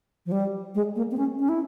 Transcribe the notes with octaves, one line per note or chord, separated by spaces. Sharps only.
F3
G3
G#3
A#3
C4
C#4
C#4
E4